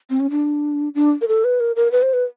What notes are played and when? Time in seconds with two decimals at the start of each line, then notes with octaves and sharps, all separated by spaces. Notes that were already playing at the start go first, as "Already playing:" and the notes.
0.10 C4
0.20 C#4
0.31 D4
0.95 D4
1.21 A#4
1.28 A4
1.44 B4
1.60 A#4
1.76 A#4
1.92 B4
2.02 C5
2.13 B4